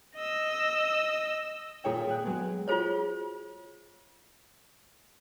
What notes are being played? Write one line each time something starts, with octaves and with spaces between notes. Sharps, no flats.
D#5 E6
A#2 G#4 C#5 G5
G#4 G5 F#6
F#3 G#3 B3
F4 F#4 G#4 C5 C#5